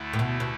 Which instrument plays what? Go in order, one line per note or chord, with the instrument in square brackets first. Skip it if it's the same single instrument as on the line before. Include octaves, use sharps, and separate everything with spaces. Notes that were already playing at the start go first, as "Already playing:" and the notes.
Already playing: [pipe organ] D2 D3 A3 E4
[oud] A2
B2
B2